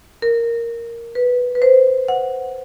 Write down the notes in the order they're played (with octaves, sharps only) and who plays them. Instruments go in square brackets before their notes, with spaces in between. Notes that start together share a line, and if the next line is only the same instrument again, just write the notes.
[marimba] A#4
B4
B4
C5
F#5